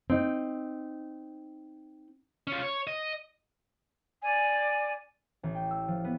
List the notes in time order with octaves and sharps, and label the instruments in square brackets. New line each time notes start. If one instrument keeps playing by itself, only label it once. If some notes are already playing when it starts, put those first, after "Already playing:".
[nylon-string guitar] C4 D#4
[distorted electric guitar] C#4 F4
C#5
D#5
[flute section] D5 G#5
[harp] A1
G5
E6
F3
B3